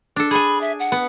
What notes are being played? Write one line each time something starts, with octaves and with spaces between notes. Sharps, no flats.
D4 A4
G#4 G#5 B5
E5
F#5
B3